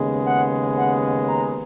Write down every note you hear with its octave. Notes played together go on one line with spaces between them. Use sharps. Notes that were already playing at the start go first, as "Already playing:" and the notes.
Already playing: D#2 C#3 G#3 B3
F#5
F#5
A#5